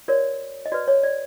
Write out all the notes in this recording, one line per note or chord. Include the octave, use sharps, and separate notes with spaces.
F#4 A#4 C#5 D5
D#5
F#4 B4 D5
C#5
D5